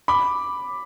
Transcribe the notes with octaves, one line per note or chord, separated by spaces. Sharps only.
B5 D6